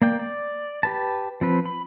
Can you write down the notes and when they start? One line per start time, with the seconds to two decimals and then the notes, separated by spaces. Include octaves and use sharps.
0.02 A#3 D5 G5
0.19 D5
0.83 G4 B4 A5
1.41 F3 C4 B4
1.66 B5